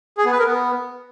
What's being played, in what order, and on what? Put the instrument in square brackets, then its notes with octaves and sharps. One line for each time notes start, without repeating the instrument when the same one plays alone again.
[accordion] G#4
B3
B4
A#4
B3